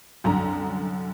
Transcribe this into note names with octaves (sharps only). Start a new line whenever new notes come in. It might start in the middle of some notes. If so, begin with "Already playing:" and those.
C2 F#2 D3 A#5